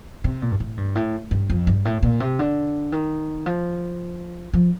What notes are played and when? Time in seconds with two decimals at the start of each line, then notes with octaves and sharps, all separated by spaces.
0.24 C3
0.42 A#2
0.51 G2
0.60 A2
0.77 G2
0.95 A2
1.31 G2
1.50 F2
1.67 G2
1.85 A2
2.03 A#2
2.20 C3
2.39 D3
2.92 D#3
3.46 F3
4.53 F3